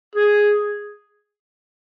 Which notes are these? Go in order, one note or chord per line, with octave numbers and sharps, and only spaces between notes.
G#4